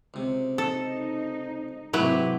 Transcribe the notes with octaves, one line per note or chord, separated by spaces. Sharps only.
C#2 C3
D#4 A4
G#2 C3 F#3 G#3 A3 E4 G4 B4